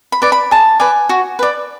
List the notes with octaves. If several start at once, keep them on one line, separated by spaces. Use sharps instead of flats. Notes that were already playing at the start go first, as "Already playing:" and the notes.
B5
B4 D5
B5
G#4 A5
B4 D5 G#5
F#4
B4 D5